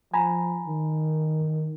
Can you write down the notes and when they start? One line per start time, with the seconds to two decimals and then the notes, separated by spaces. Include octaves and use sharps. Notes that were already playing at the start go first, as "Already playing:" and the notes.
0.14 F3 G#5 A#5 B5
0.67 D#3